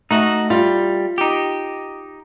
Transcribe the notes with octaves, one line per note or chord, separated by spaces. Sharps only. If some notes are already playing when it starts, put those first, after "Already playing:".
A3 D#4 F#4
G3 F4
D#4 G4